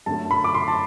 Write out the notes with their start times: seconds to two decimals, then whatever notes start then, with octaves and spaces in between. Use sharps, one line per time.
0.06 F#2 D3 A3 A5
0.31 B5
0.44 D6
0.54 C6
0.68 A5